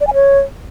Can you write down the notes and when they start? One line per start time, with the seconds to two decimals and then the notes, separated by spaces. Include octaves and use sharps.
0.01 D5
0.07 G#5
0.14 C#5